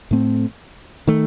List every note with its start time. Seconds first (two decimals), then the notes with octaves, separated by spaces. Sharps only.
0.11 A2 A3 C4
1.07 D#3 A3